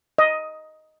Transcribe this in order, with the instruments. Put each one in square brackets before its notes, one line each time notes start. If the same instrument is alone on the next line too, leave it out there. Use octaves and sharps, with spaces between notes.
[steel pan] D#5